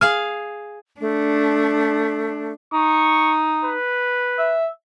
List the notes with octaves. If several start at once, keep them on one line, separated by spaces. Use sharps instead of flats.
G#4 F5 G#5 F6
A3 D4
D#4 C#6
B4
E5